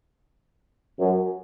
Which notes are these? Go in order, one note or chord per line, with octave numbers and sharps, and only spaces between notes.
F#2